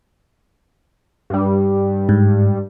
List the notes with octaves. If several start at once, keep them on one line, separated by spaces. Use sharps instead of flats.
G2 G3
G#2